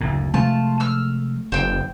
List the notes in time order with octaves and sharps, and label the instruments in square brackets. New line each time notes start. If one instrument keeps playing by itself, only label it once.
[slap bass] F#1 D2 A2
[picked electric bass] C3 F3 G#3 [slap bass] A3 [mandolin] F4 A5
[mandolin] E6 F6
[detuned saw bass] F#1 [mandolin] C5 G5